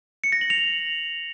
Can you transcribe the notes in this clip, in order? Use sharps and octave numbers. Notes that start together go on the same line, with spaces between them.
C#7
A#6
F#7
F7